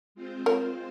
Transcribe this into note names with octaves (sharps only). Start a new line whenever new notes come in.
G#3 C4 F4 C5
A#4 C#5